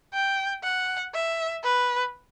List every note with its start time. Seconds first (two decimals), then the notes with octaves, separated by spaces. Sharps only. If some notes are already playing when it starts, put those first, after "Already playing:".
0.13 G5
0.64 F#5
1.14 E5
1.63 B4